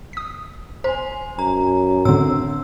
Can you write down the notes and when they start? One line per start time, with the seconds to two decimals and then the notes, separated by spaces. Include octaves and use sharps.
0.13 D#6 B6
0.84 C5 G#5 C6
1.39 F#2 A#5
2.05 D2 A2 D3 C4 C6 E6